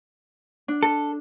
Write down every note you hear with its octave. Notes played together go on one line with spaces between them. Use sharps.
D4
A4